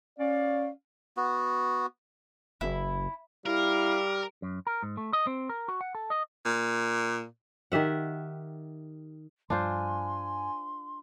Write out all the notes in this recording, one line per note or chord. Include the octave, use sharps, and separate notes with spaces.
C#4 D5 F5
B3 F#4
F#1 E4
G3 E4 A#4 F5
F#2
A#4
G#2
A3
D#5
C4
A#4
F#4
F#5
A4
D#5
A#2
D#3 G4 E5 F#5
G2 F3 G3 D4 F4 C5 G#5 C6